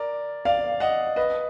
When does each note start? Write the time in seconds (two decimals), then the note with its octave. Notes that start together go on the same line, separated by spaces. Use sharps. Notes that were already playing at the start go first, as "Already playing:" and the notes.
Already playing: A#4 D5
0.45 D5 F5
0.80 D#5 F#5
1.16 B4 D#5